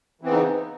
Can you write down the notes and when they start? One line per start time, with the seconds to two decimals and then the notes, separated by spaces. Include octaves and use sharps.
0.21 E3
0.24 C4
0.27 B3
0.29 C#3
0.32 D#4